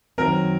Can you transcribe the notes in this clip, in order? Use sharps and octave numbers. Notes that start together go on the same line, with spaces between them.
F#2 D#3 F#3 C4 A#4